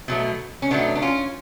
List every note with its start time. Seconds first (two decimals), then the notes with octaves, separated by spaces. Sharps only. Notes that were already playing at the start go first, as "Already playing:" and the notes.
0.08 B2 F#3 A3
0.62 C#4
0.71 B2 F#3 A3 B3 D4
0.95 D4
1.02 C#4 F4